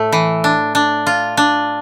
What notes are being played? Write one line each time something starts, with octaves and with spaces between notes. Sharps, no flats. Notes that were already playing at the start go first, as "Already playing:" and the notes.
Already playing: A2 A3
E3
D4
D4
F4
D4